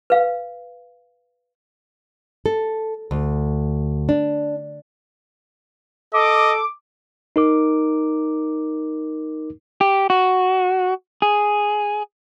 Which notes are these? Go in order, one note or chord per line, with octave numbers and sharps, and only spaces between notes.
B4 F5
A4
D2
D4
A4 D#5 D6
D#4 A#4 D6
G4
F#4
G#4